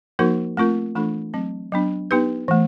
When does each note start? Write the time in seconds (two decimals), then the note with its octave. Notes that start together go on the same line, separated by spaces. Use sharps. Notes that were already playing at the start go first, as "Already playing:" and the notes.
0.19 F3 A#3 D#4 F#4 A#4
0.57 A3 C4 F4 A#4
0.95 E3 A3 D4 F4 A4
1.33 F#3 A3 C4
1.72 F#3 B3 D4
2.11 B3 D#4 G4 B4
2.48 E3 A3